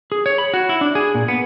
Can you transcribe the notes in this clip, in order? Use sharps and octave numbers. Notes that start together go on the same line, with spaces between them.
G#4
C#5
B5
F#4
E4
D4
G#4
A#2
B3